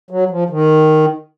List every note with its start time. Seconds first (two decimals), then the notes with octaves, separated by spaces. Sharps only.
0.10 F#3
0.30 F3
0.50 D#3